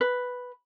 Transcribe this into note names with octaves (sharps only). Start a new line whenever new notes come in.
B4